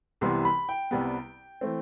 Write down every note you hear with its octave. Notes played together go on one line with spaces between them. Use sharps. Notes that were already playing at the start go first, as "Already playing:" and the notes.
C2 C3 E3 B3 C6
B5
G5
C2 C3 G3 B3
E3 A3 C4